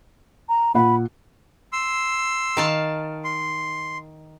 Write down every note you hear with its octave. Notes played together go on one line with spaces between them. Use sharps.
A#5
A#2 F#5 B5
C6 E6
D#3 F5 A5
C6